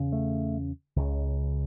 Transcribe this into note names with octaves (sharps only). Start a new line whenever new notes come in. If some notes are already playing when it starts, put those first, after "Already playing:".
Already playing: E2 C#3
A3
C#2 C#3